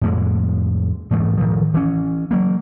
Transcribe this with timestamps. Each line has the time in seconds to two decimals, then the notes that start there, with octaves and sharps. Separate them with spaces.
0.01 F2 A2 G#3
1.11 G#2 E3 G#3 A3
1.37 A2 D#3 F3
1.74 E3 C#4
2.31 F#3 A#3